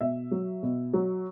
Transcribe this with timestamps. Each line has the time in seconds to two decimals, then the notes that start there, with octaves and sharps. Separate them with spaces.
0.01 B2 E5
0.31 F#3
0.63 B2
0.93 F#3